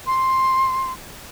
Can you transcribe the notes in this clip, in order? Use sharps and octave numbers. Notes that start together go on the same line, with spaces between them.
C6